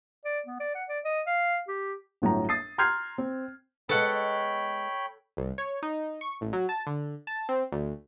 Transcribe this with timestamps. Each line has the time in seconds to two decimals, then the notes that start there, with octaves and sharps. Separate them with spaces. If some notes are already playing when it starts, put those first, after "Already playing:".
0.25 D5
0.46 B3
0.60 D5
0.75 F#5
0.89 D5
1.05 D#5
1.27 F5
1.68 G4
2.22 G1 A2 F#3 A#5
2.49 D#6 A6 C7
2.78 A#5 C6 F6 G6 G#6 C7
3.18 C4
3.89 G#3 B3 A4 C#5 F#5 G5 B5
5.37 C2
5.58 C#5
5.83 D#4
6.21 C#6
6.41 A1
6.53 F#3
6.69 A5
6.87 D3
7.27 A5
7.49 C4
7.72 D2